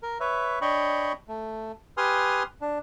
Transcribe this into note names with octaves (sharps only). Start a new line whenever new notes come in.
A#4
B4 C#5 E5
D4 C#5 D#5 G5 B5 C#6
A3
G4 B4 G#5 C6 D#6 F6
D4